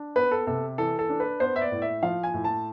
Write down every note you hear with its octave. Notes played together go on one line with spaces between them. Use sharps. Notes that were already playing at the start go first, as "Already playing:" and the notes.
Already playing: D4
B3 B4
A4
C3 A4
E3 A4
A4
D4
B4
B3 C5
E5
D5
A2
E5
F3 F5
G#5
A2
A5